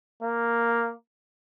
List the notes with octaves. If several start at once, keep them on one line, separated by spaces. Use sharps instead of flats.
A#3